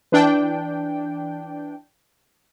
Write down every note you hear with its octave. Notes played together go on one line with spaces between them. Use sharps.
E3 D4 G5